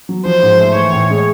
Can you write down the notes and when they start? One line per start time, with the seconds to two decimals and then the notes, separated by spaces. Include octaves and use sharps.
0.09 F#3
0.25 F3 C5
0.43 G#2
0.59 A3
0.76 E3 C#5
0.93 A2
1.10 G#3